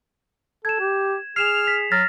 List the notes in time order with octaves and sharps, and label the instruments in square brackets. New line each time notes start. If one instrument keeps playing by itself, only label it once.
[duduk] A4 [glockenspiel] G#6 E7
[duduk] G4
[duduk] G#4 [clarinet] F6 [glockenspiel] C7 E7 F7
[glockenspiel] B6
[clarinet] F#3 [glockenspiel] F6 A6 A#6